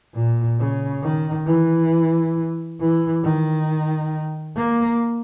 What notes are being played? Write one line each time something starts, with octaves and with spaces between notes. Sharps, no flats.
A#2
C#3
D#3
E3
E3
D#3
A#3